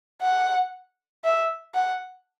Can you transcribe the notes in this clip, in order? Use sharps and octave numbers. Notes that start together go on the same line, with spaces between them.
F#5
E5
F#5